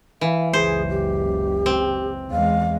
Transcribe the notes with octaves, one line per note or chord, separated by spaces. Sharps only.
E3 F5
F#1 C#2 G#4 C5
G4
C4
E2 G#3 F5